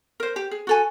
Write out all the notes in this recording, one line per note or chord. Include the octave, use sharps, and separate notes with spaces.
A#4 C5
G4
G#4
F#4 A4 G#5